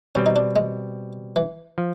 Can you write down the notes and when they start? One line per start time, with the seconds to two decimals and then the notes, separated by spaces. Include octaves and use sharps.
0.15 B2 G3 C4 C#4
0.26 D#4
0.36 D4
0.56 G#3
1.36 E3
1.78 F3